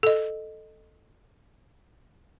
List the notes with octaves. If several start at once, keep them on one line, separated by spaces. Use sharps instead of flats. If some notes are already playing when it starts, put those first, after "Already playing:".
A4 D#5